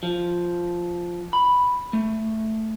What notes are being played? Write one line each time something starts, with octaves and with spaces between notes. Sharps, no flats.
F3
B5
A3